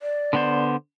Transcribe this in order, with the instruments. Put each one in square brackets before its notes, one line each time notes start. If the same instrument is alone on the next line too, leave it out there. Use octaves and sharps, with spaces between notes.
[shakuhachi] D5
[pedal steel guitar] D3 B3 C5